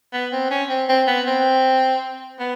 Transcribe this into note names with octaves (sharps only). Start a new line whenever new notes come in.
B3
C4
C#4
C4
C4
B3
C4
B3